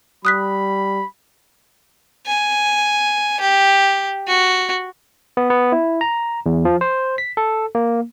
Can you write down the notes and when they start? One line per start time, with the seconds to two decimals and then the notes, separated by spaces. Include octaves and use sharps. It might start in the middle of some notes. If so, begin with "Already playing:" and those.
0.25 G3 B5 D#6 F#6 B6
2.26 G#5
3.40 G4
4.27 F#4
5.37 B3
5.50 B3
5.72 E4
6.01 A#5
6.46 E2
6.65 F3
6.81 C5
7.18 B6
7.37 A4
7.75 A#3